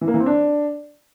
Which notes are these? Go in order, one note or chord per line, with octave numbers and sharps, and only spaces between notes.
E3
A#3
E3
C4
D4